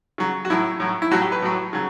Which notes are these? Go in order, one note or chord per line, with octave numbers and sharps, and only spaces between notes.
C#3 F#3
F#4
A2 F#3 E4
A2 F#3
E4
A2 F#3 F#4
G4
B4
A2 F#3
C#3 F#3